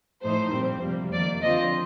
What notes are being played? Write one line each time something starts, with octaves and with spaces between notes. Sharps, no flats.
A2 F3 A3 D#4 C5
A#2 G3 C4
F2 C3 G3 A#3
F2 D#3 A#3 D5
D3 F3 C4 F4 D#5